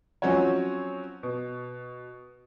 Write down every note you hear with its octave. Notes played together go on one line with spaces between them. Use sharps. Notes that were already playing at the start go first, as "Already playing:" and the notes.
F3 F#3 C4 C#4 F#4 C#5
B2